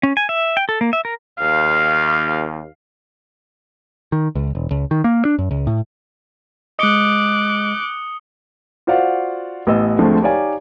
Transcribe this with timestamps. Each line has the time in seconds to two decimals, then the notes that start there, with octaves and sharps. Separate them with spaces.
0.03 C#4
0.17 G#5
0.29 E5
0.57 G5
0.69 A4
0.81 A#3
0.93 E5
1.05 A#4
1.39 D#2 F5
4.12 D#3
4.36 C#2
4.55 E1
4.71 C#2
4.91 D#3
5.04 A#3
5.25 D4
5.39 F#2
5.51 C#2
5.67 A2
6.79 G#3 D#5 D6 D#6 F#6 C#7 G7
8.87 F4 F#4 C5 D5 F5 F#5
9.67 A1 B3 D#5 E6
9.99 D2 D3 F3 G#3 A3 C4
10.22 D#4 G4 C#5 D5 F5 G#5